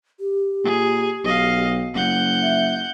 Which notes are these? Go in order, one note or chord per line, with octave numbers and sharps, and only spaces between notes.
G4
A#2 G#4
B1 D#5 F5
F#1 F#5 G6
E5